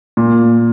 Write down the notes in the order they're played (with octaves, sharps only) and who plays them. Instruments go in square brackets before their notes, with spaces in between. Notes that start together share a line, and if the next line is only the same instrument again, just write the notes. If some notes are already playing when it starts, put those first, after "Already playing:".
[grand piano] A#2